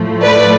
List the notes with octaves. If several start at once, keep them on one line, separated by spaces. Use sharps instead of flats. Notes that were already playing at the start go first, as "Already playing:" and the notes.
Already playing: A2 F3 A3
B4 D5